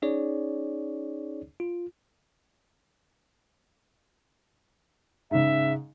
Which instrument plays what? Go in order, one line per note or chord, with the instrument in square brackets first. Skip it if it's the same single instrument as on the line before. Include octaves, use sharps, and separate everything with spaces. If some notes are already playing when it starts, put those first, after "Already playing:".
[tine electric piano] C#4 D#4 G#4 C#5 D5
F4
[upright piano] G#2 C#3 [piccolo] E5